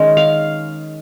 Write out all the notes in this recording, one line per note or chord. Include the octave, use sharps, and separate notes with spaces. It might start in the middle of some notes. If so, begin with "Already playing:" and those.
Already playing: D#3 G#3 C#4
F5